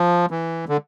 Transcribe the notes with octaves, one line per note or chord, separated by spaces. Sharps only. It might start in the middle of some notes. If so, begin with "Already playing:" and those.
Already playing: F3
E3
D3